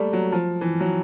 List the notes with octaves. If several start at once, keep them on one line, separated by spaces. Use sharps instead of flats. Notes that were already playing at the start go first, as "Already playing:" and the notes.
Already playing: G3 A3 A#3
F#3
F3
E3
F#3